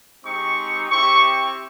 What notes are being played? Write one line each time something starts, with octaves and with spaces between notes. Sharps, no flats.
G#3 C4 D#4 G4 C#6
C4 E4 G4 C#6